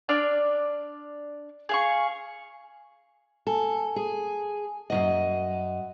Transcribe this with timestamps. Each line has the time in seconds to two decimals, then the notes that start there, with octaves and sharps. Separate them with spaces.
0.09 D4 D5 F6
1.69 G#4 F5 C#6
3.47 A4 G#5
3.96 G#4
4.90 F#2 D#3 D#5 F#5